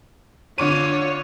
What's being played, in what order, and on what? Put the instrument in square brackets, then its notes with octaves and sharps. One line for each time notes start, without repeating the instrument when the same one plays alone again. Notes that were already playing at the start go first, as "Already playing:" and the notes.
[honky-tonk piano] D3 D6 D#7 [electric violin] F4 C#5